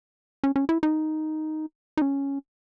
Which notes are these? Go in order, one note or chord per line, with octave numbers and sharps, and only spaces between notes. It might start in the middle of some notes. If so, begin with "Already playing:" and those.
C#4
C#4
E4
D#4
D#4
C#4